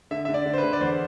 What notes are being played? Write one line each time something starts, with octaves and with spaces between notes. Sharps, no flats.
D3 E5
D3 E5
D5
D3
C5
B4
D3
D5
E2 C5